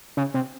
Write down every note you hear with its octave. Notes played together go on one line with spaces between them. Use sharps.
C#3
C3